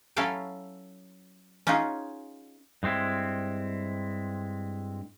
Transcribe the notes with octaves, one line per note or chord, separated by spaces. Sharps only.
F#3 C#4 E4 A4 F5 G5
C#4 D#4 F4 F#4 G#4
G2 G#3 C4 E4